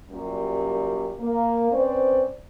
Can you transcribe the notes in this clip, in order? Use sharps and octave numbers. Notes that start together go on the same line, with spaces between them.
F#2 A#2 G3
A#3
C4 C#4 B4 C5 D5